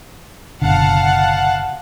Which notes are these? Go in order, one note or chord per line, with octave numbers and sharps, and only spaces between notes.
F#1 B2 D3 F5 F#5 A5